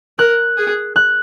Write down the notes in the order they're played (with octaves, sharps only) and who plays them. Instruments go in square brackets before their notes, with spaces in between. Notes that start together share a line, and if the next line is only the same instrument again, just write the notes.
[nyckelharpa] A#4 [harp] F#6
[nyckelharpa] G#4
[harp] F#6